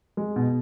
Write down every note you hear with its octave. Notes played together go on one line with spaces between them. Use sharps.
G#3
B2